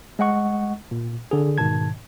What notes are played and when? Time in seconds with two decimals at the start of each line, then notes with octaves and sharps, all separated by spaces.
0.19 G#3 D#5 F#5 C#6
0.91 A#2
1.31 D3 G#4
1.58 G#2 B2 D#3 A5 G#6